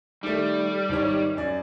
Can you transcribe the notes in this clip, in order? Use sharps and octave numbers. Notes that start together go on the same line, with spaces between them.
D#3 G3 A3
G#1 D#3 C#5
F#2 D5